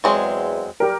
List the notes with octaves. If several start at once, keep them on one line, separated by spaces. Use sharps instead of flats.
E2 F#3 G#3 C4
G3 G4 A#4